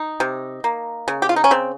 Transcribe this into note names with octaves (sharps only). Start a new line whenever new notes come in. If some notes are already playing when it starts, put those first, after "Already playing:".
Already playing: D#4
C3
A#3
C#3
G4
F4
D#4
C#4
C#3 C4